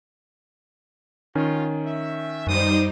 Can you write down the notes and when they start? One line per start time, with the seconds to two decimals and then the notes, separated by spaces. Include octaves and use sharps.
1.35 D#3 C#4 F4
1.85 E5
2.47 F#2 G3 B3 D#4 C5 D6 D#6